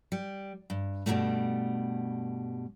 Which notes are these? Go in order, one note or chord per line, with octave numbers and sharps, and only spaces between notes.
G3
G2
G2 B2 D#3 E3 G3 A3